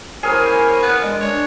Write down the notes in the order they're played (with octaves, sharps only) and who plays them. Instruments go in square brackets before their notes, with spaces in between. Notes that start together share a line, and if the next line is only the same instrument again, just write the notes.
[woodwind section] A#3 E4 C5 [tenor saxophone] C#4 [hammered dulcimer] G#4 A#4
[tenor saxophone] B3
[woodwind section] G#3 [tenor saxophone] D4
[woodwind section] D4 [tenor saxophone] C#5